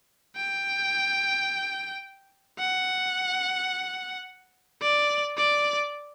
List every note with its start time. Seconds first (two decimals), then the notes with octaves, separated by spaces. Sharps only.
0.36 G5
2.59 F#5
4.82 D5
5.37 D5